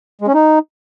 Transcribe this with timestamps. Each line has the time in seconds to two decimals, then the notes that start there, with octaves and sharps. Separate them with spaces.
0.21 G#3
0.28 C#4
0.34 D#4